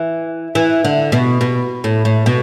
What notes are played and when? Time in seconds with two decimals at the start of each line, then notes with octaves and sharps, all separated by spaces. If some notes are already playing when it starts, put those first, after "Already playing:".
Already playing: E3
0.55 E3
0.84 D3
1.12 B2
1.41 B2
1.84 A2
2.05 A2
2.26 B2